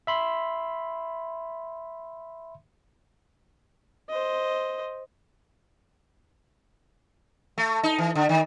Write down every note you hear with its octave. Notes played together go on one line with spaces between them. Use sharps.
E5 B5 C6
C5 D#5
A3
D#4
E3
D3
D#3